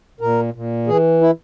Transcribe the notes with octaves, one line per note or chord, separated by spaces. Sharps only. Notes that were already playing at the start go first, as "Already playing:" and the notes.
A#2 A#4
A#2
E3 G#4
E4